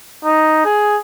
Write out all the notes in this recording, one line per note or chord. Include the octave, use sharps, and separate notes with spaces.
D#4
G#4